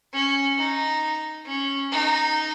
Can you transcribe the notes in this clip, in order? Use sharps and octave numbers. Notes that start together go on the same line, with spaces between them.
C#4
D#4
C#4
D#4